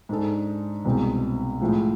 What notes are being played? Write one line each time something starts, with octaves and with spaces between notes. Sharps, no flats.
G#2 G#3 D4 A4
C2 B2 G#3 C4
A2 F3 G#3